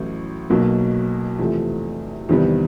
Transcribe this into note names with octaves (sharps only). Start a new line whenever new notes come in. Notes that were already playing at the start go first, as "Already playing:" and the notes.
Already playing: A1 A2 F#3
B1 B2 F#3 A#3
E2 C3 F3 A3
E2 C3 D#3 G3 B3